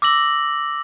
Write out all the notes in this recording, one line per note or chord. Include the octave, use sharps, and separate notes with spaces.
D6 E6 A#6 F#7